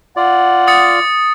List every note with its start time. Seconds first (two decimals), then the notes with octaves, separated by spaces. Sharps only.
0.17 F4 D5 F#5
0.67 D#6 A6 C#7